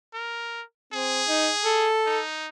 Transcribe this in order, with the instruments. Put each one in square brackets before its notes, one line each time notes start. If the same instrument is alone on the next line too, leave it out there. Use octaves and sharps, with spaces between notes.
[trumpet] A#4
[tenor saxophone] C4 [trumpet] G#4
[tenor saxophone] D#4
A4
[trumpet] D#4